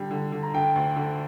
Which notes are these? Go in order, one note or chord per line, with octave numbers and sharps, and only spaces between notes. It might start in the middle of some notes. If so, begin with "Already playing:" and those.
Already playing: D3 G3 G5
D3
D3
A#5
D3 G5
D2
D3